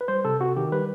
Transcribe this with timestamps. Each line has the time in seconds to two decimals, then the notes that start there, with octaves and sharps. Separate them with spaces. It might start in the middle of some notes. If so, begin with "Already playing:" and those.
0.01 B4
0.08 G3 C5
0.25 C3 A4
0.40 C3 F#4
0.56 D#3 G4
0.72 G3 B4